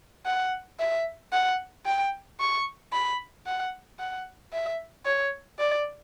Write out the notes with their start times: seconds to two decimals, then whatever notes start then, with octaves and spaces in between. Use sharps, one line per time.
0.26 F#5
0.80 E5
1.33 F#5
1.86 G5
2.40 C#6
2.93 B5
3.46 F#5
3.99 F#5
4.53 E5
5.06 C#5
5.59 D5